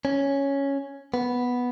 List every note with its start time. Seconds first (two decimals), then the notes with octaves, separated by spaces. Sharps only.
0.05 C#4
1.14 B3